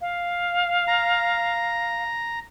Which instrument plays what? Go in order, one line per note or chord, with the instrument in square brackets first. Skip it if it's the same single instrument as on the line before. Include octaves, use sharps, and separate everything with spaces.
[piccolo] F5
[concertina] A#5